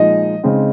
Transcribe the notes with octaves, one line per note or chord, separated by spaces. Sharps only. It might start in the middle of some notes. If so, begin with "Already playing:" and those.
Already playing: A#2 F3 G#3 D#4 D#5
C#3 G#3 C4 D#4